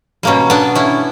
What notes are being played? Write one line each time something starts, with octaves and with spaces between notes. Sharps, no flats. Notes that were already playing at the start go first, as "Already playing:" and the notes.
B2 G3 A#3 C#4
B3 D4
C#4 E4